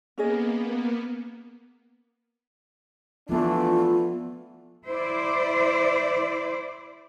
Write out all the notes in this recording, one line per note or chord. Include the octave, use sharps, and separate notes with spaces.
A#3 B3 C#4 G#4 D#5
E3 F3 A3 B3 D4 F4
E4 C5 D5